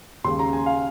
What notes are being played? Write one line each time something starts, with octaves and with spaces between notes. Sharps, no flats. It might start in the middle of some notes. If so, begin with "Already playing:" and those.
D#2 C#3 G#3 C6
A#5
G#5
F5